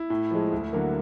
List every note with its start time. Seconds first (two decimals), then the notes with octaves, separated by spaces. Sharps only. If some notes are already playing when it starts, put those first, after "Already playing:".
Already playing: E4
0.10 A2
0.31 F3 G#3
0.52 D2
0.73 D3 F#3 A#3